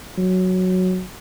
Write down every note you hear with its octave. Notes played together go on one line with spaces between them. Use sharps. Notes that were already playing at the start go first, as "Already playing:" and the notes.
F#3